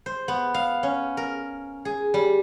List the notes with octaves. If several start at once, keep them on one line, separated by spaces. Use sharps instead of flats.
C5
B3
F5
C#4
A#4
G#4
G3